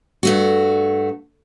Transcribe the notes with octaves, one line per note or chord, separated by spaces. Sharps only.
G2 A3 F#4